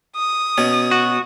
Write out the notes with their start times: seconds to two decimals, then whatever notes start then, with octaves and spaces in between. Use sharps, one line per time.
0.16 D#6
0.58 B2 C#4
0.91 F#4